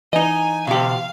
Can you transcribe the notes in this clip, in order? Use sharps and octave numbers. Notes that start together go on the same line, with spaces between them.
E3 D#4 D#5 G#5
B2 G4 F5